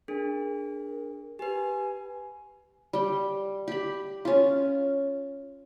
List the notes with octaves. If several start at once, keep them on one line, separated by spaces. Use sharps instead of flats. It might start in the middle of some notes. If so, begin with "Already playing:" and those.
D4 G#4 A#4
G4 B4 G#5
G3 G5
G4 B5
C#4 F4